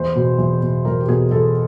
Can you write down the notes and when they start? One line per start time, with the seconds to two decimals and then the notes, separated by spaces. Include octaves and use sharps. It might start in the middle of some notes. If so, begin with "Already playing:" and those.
Already playing: E2 C5
0.15 B2
0.38 E2
0.62 B2
0.85 E2 A#4
1.00 G4
1.08 B2 G#4
1.31 E2 A4